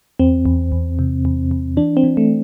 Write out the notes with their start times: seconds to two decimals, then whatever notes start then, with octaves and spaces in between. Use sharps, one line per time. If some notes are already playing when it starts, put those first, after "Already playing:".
0.19 E2 C4
0.46 E2
0.72 E2
0.99 C3
1.25 E2
1.51 E2
1.77 E3 D4
1.97 C4
2.03 E3
2.17 A3